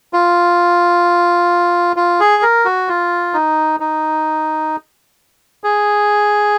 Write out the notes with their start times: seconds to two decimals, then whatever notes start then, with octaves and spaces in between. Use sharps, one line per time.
0.13 F4
1.96 F4
2.20 G#4
2.43 A#4
2.65 F#4
2.89 F4
3.34 D#4
3.80 D#4
5.64 G#4